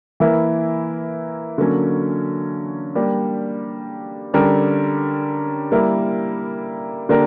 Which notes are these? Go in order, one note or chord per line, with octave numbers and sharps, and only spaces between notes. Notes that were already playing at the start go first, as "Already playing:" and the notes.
E3 A#3 E4 A#4
D3 F#3 A#3 C#4
G3 A#3 D4 G4
D3 G3 C#4 G4 A#4
G3 A#3 E4 A#4
D3 A#3 D4 G4 A#4